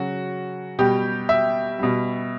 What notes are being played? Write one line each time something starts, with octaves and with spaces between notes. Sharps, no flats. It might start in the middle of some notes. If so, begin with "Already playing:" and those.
Already playing: C#3 F#3 F#4
B2 G3 G4
E5
B2 G3